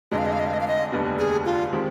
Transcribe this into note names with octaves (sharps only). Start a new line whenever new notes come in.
F1 F2 D3 G#3 D#5
F5
D#5
F5
D#5
F5
D#5
F5
D#5
F1 D#2 D3 G3 B3
G#4
F4
D#3 G#3 C4 G4